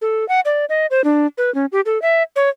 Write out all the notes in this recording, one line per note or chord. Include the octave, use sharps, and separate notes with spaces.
A4
F#5
D5
D#5
C5
D4
B4
C#4
G4
A4
E5
C#5